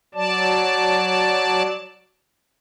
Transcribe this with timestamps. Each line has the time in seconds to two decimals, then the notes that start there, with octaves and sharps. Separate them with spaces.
0.14 F#3 D5 A5